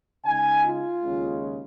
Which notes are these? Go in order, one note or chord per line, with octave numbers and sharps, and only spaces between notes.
C#3 G#3 D#4 G#5
F4
D#2 C#3 G#3 C#4